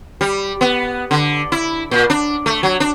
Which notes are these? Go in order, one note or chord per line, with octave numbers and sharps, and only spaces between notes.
G3
B3
D3
E4
A#2
D4
A3
F#3
D4